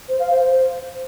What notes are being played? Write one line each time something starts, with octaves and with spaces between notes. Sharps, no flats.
C5
F5
C5
C5